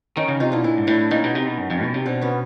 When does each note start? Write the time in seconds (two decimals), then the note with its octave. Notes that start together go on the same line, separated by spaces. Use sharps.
0.16 D#3 C#4 D#4
0.28 C#3
0.40 C3 D#4 F4
0.52 B2 D4 E4
0.64 A#2 D4 E4
0.78 G#2
0.87 A2 D4 E4
1.11 A#2 C#4 D#4
1.24 B2
1.35 C3
1.47 B2
1.58 F#2
1.70 F2
1.83 B2
1.94 C3
2.06 B2 C4 D4
2.21 B3 C#4